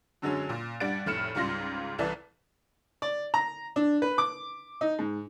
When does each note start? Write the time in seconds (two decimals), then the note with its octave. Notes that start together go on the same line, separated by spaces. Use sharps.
0.22 F#2 D3 F#3 G#3 C#4
0.49 A#2
0.80 G2 G3 D5 F#5 A6 D7
1.06 F1 A2 F6 C#7 E7
1.35 C#2 G#2 G3 F4 C6 A#6
1.98 C2 E3 A4 D5 E5
3.02 D5
3.34 A#5
3.76 D4
4.02 B4
4.18 D6
4.81 D#4
4.99 G#2